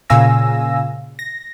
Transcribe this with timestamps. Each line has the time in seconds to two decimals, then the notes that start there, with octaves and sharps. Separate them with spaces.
0.10 A#2 C#3 F5 G#5 E6 A#6
1.19 A#6